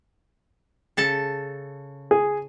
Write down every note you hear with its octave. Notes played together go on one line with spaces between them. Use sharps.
C#3 A4 A5
G#4